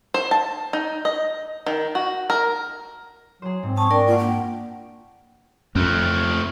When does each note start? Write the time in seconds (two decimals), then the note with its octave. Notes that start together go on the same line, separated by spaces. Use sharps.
0.14 C5
0.31 A5
0.73 D#4
1.05 D#5
1.66 D#3
1.95 F#4
2.30 A#4
3.42 F#3 G#4 C5
3.63 G#2 C4
3.77 A5 C#6 D#6
3.91 D4 A#4 D5 G5
4.07 A#3 F4 F#5
4.18 G5
5.75 F2 A3 C4